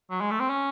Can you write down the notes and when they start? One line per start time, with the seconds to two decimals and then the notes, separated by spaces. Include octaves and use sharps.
0.11 F#3
0.21 G#3
0.31 A3
0.40 C4
0.50 C#4